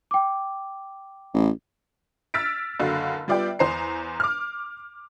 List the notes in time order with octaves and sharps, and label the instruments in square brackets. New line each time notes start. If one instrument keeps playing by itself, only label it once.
[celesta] G5 D6
[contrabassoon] A1
[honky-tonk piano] E6 F6 A6 B6 D7
F#1 D3 F#4 F5
G3 B3 F4 D5 E5 G5
E2 C5 A#5 C7
D6 F6